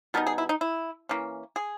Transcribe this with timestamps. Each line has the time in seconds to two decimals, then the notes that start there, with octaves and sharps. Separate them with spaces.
0.14 B2 G3 B3 D#4 A#4
0.27 G#4
0.38 E4
0.49 D#4
0.61 E4
1.09 E3 A#3 C#4
1.56 G#4